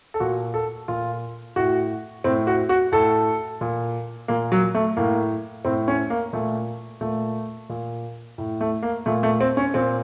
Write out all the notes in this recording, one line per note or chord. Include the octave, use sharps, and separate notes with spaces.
A4
A#2 F#4
A4
A#2 F4
A2 F#4
A2 C4
F#4
F#4
A2 A4
A#2
A#2 A#3
F#3
A3
A2 A#3
A2 C4
C#4
A#3
A#2 A3
A#2 A3
A#2
A2
A3
A#3
A#2 A3
A3
C4
C#4
A#2 C4